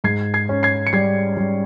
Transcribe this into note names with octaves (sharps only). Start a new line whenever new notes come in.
G#2 G#6 C7
G#6 C7
C#4
G#6 C7
C#7
G3 G#6 C7
G3